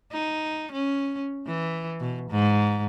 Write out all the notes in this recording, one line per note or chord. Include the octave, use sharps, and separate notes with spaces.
D#4
C#4
E3
B2
G#2